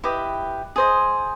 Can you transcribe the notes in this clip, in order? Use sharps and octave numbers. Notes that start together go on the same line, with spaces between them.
E4 G4 B4 D#5
G#4 C5 D#5